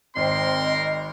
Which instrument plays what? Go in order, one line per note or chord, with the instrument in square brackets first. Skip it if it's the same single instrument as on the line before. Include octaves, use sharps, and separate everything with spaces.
[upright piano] G#1 [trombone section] C4 [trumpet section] A#4 C6 [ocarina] D#5